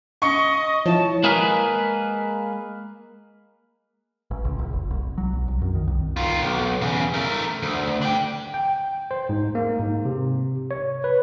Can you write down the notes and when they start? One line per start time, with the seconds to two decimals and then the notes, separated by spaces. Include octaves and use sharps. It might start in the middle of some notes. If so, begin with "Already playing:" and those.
0.22 D#5 C#6 C#7
0.86 F3 E4 C#5 A5
1.24 G#3 A#3 G#4 A#4 B4
4.31 A1
4.44 C#2
4.59 A#1
4.73 F1
4.91 C2
5.18 F#3
5.33 B1
5.48 C2
5.62 F#2
5.75 D#3
5.87 C2
6.17 D#3 F4
6.42 B1
6.82 E2 C#3
7.14 A3 A#4
7.62 D2
8.02 D4 G5
8.54 G5
9.11 C5
9.29 G#2
9.55 A#3
9.79 G#2
10.05 C3
10.71 C#5
11.04 B4